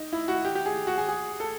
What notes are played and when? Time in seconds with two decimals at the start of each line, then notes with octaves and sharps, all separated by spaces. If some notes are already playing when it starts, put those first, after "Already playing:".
Already playing: D#4
0.13 E4
0.28 F#4
0.45 G4
0.55 G4
0.66 G#4
0.87 F#4
0.98 G#4
1.08 G#4
1.40 A4